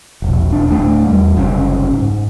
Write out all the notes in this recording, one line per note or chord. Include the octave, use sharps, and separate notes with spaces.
E1 A#1
E1 D4
D1 F2 A3 D4
E2 G3
F#1 C2 C4 C#4
G#2